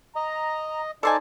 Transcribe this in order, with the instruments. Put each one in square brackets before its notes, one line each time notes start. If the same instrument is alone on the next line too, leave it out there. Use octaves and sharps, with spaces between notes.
[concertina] D#5 [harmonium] A#5
[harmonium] D#4 [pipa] A4 C5 G#5 [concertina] D5 A5